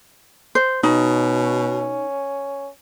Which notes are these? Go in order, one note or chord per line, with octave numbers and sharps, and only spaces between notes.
C5
B2 C#4 D#4